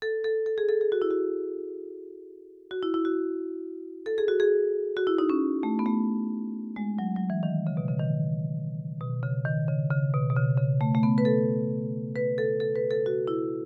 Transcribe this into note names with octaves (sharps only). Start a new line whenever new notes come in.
A4
A4
A4
G#4
A4
G#4
F#4
E4
F#4
F#4
E4
E4
F#4
A4
G#4
F#4
G#4
F#4
E4
D#4
C#4
A3
B3
A3
G#3
F#3
F#3
E3
D#3
C#3
B2
C#3
D#3
B2
C#3
D#3
C#3
C#3
B2
B2
C#3
C#3
A3
A3
B3
B4
A4
B4
A4
A4
B4
A4
F#4
E4